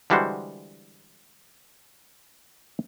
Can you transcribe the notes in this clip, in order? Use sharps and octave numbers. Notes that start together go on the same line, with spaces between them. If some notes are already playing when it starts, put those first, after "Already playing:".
D3 E3 G3 G#3 F#4 C5